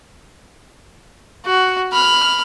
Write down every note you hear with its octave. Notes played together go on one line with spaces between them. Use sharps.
F#4
B5 F6